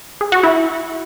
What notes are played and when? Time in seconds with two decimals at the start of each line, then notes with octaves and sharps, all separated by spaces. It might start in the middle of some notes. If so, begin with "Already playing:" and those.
0.21 G#4
0.32 F#4
0.43 E4